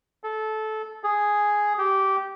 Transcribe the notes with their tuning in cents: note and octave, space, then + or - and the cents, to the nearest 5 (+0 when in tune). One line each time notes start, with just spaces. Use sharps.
A4 -20
G#4 +0
G4 -15